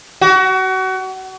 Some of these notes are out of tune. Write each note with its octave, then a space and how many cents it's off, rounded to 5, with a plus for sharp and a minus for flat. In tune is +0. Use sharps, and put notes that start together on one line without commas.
F#4 +30